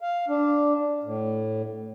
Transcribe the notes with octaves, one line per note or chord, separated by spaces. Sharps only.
F5
D4
A2